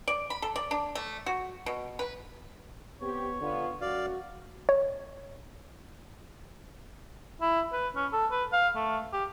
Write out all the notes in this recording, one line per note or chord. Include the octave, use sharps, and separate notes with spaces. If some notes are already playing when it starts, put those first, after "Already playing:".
D5
B5
A4
D5
D4
A3
F#4
B2
B4
B3 C4 G4 C#5
D3 B3 D4 F4
F#2 F#4 D5 F5
C#5
E4
B4
C#4
A4
B4
F5
A3
G4